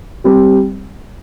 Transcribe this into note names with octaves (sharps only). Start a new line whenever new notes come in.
G3 C4 G4